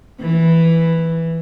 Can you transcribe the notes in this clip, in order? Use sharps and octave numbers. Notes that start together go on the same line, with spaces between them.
E3